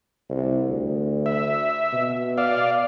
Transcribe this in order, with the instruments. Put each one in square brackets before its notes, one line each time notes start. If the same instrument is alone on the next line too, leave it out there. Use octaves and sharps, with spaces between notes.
[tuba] C2
D2
[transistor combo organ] E5
[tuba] B2
[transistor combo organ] D5 F5